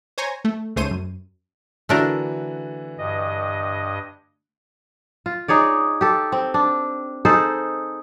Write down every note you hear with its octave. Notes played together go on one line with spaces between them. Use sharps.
C5 C#5 G#5 A#5
A3
C#2 G#2 A3 C5 C#5 D#7
F#2
D3 E3 A3 D4 F#4 A#4
G2 D#5
F4
D#4 G#4 C#5 D5
G4 A4
C4
D4
D#4 G#4 A4 C5